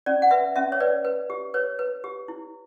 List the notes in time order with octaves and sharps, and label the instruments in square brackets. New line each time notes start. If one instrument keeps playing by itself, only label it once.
[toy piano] C#4 D5
F#5
B4 E5
C#4 E5
C#5
B4 D5
B4
G4
B4 C#5
B4
G4
E4